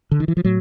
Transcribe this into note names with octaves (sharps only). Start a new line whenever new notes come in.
D3
D#3
E3
F3
A2 F#3